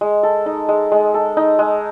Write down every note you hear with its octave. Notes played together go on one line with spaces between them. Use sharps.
G#3
A4
D#4
G#3
G#3
A4
D#4
G#3